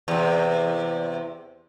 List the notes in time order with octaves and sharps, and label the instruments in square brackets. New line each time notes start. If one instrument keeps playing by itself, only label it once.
[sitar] E2 C3